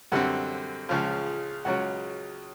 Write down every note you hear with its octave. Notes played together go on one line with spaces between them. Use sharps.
F#2 D3 G3 C4 F#5
C#2 C#3 F3
C#2 C#3 F#3 F#5